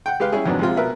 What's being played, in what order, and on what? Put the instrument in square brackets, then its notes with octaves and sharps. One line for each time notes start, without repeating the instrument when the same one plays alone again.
[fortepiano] F#5 G5
G#3 G4 B4 F5
G3 C#4 E4 G#4
F2 G#2 F#3 B3 D4
A#1 C3 G#3 C4 F4
B2 A#4 B4 E5